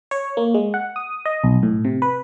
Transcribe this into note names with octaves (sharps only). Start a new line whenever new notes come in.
C#5
A#3
G#3
F#5
D#6
D#5
B1
A2
C3
B4